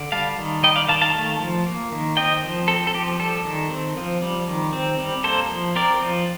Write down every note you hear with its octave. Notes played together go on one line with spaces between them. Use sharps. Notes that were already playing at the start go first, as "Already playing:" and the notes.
Already playing: D3
G3 F5 A5
D#3
G3 D#5 G5
D5 F5
D#3 F5 A5
F5 A5
A3
F3
A#3
D#3
C4 D#5 G5
F3
C4 A4
A4
F3 G4
G3 A4
D#3
C4
F3
G3
D#3
C4
G3
A#3 A4 C5
F3
C4 A#4 D5
F3